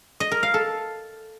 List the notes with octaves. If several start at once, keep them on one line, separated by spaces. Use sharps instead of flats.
D#5
A#4
F5
A4